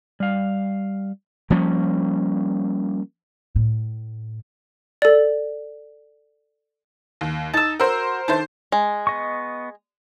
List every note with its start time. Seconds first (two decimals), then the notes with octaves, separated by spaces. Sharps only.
0.20 G3 F5
1.50 F3 G3 A#3 C#4
3.56 A2
5.02 A4 D5
7.21 D#2
7.54 D#4 A5 E6
7.80 F#4 A#4 C5 E6
8.28 D#3 A3 D4 C5
8.72 G#3
9.07 B3 D#5 C#6